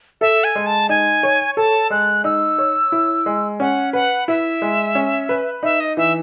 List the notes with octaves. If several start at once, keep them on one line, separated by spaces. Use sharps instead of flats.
A4 E5
G#5
G#3
A5
D#4 G#5
C#5
A4 A5
G#3 F#6
D#4 E6
C#5
E4
G#3
C#4 F#5
B4 F#5
E4 E5
G#3
C#4
B4
D#4 E5
D#5
E3 E5